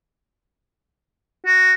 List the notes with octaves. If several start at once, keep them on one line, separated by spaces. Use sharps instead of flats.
F#4